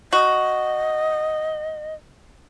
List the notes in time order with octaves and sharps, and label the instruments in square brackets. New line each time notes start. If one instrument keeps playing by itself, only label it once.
[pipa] F#4 [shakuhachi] D#5